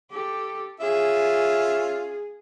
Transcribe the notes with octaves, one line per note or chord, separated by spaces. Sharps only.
G4 A4
C#4 F4 G#4 E5